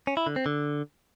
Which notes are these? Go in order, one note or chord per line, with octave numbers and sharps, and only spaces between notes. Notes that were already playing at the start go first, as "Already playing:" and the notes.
C#4
E4
D3
C4
D3